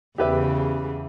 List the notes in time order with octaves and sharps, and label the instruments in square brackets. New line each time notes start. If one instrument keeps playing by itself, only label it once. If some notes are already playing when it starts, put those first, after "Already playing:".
[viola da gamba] E2 C#3 [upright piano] G4 B4 E5